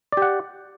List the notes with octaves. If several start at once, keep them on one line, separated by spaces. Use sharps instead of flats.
G4 D5 F#5